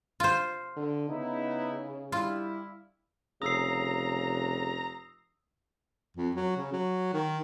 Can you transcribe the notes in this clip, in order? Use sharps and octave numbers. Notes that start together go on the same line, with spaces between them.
F4 C5
D3
C#3 B3 D#4 E4
G3 E4 F4
F1 C#3 A#5 D#6 E6 C7
F2
F#3
C#3
F#3
D#3